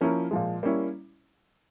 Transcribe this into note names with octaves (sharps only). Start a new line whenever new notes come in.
F3 A#3 C#4 E4 A#4
A#2 F3 G#3
G3 A#3 C#4 E4